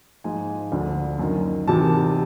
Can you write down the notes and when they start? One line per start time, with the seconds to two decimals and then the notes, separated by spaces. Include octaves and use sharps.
0.24 G#2 F3 G#5
0.72 D2 D3 F3
1.19 F#2 D#3
1.68 E2 C3 D#3 A5